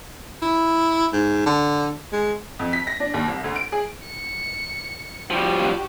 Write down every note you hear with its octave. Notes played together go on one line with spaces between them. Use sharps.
E4
G#2
D3
G#3
F2
B6
A#6
D4
D#2
C2
D2
D7
G#4
C#7
F3 G3 F#4 G4